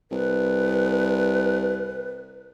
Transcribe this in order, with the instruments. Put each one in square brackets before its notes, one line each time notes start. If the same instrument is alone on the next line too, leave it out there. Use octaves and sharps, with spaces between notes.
[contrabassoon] C2 [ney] B4